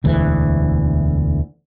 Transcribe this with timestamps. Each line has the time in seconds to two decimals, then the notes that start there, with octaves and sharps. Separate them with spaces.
0.04 E1 D2 E3